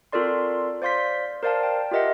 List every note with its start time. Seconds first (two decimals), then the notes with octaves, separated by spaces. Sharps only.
0.12 C4 F4 A4 A#4 D5 C6
0.82 C5 D5 F5 C6 G6 B6
1.43 A#4 C5 D5 F5 A5
1.63 G5
1.91 F4 G4 A#4 D#5 E5 F#5